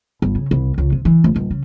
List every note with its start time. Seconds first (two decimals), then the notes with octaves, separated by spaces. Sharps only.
0.22 G1
0.35 C#3
0.51 C2
0.78 C#2
0.92 C3
1.05 E3
1.24 F1
1.36 D#1
1.51 C#3